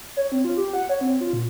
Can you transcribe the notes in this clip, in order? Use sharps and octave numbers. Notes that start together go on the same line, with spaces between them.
C#5
C4
F4
G4
F#5
C#5
C4
F4
A#2